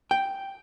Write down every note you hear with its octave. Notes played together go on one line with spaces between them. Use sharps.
G5